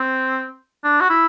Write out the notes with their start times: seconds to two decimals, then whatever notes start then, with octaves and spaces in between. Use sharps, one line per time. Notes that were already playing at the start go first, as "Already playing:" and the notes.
Already playing: C4
0.84 D4
1.01 F#4
1.10 E4